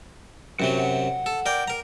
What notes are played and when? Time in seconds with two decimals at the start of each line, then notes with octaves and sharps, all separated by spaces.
0.60 F#2 C3 F#3 F#4
0.79 F#5
1.26 A4
1.46 A#4 D5 G5
1.68 A#4 A#5